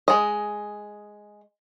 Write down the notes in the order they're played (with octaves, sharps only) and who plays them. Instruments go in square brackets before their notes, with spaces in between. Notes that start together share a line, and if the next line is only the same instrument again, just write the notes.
[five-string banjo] G#3 D#5